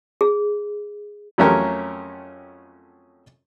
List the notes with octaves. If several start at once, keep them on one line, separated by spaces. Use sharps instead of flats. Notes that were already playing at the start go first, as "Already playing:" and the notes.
G#4
F2 F#3 A3 C#4 G4 A#4